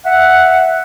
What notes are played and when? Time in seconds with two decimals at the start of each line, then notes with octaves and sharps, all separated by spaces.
0.06 E5 F#5